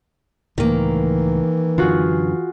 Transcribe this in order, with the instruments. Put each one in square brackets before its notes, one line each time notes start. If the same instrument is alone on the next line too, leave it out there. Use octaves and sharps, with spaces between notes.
[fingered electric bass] C#2 A2 [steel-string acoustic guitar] D#3 A#3 [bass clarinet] E3
[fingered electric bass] F#2 D3 [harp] F4 F#4 G#4